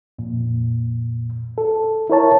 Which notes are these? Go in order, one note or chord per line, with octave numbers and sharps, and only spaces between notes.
F2 A#2
A4
E4 A#4 C#5 A5